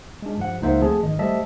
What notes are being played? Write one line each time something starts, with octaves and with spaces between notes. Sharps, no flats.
G#3 D4
G2 F3 F#5
C#2 A#3 D#4 C5 E5 F#5
F3 A3 C4 G#4 A5
G#1 D#5
G3 A3 C5 D#5 E5 A5